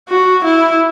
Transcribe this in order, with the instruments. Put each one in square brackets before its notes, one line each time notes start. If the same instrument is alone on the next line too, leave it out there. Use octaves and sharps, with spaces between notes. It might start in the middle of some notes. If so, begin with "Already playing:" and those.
[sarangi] F#4
E4